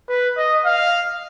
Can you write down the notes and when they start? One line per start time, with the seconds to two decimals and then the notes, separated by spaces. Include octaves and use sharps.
0.09 B4
0.37 D#5
0.65 F5